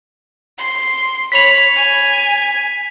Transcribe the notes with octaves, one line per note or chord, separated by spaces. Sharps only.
C6
C#5 B5 B6 F7
G#5